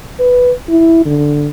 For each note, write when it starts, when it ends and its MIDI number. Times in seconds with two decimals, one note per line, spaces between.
0.19 0.52 71
0.69 1.03 64
1.06 1.50 50